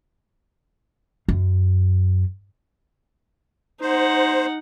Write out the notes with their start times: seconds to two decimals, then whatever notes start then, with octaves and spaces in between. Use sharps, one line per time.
1.28 F#2
3.81 D#4 C5 F#5